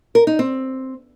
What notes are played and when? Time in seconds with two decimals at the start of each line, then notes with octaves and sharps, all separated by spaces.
0.15 A#4
0.27 D#4
0.39 C4